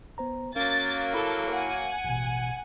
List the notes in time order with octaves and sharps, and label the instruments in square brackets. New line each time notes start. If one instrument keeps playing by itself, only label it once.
[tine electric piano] B3 C5 A#5
[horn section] F#3 A#3 [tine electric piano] C#4 [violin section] A6
[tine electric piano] E4 F5 B5 [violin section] A4
[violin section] F#5 G#5
[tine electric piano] A1 B2